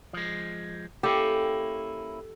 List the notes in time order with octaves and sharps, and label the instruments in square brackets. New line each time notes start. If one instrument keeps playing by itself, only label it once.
[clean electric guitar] F3 G#3
[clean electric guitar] A#3 C#4 E4 [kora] G4 [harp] A4